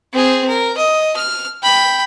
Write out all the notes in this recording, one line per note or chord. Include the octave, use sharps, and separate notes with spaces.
C4 G#4
A#4
D#5
F6
G5 B5